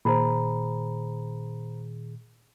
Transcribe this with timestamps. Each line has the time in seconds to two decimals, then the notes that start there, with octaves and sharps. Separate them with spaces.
0.05 A#2 D#3 G#4 C5 A#5 B5